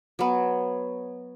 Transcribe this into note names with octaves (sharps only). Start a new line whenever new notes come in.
F#3 B3